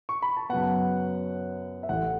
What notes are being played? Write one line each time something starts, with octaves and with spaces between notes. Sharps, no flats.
C#6
B5
A5
F#2 C#3 F#3 B3 F#5
E5
A1 A2 A3 F#5